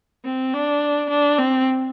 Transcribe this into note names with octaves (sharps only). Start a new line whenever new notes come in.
C4
D4
D4
C4